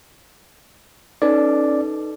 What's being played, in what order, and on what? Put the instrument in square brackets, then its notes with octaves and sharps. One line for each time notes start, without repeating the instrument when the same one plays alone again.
[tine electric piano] C#4 D5 [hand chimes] D#4 A4 B4